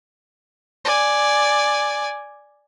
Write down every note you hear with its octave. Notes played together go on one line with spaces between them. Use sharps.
D5 G#5